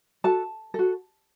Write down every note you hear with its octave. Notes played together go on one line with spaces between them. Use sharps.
F#4 A4 A5
F#4 A4